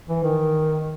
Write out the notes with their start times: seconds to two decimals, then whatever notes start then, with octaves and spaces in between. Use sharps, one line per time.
0.08 E3
0.23 D#3